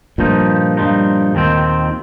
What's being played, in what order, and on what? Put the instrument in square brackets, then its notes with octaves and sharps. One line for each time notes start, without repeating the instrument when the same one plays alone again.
[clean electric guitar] G2 F3 D#4 [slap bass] A#2
[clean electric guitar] G2 F3 D#4
D#2 D#3 C4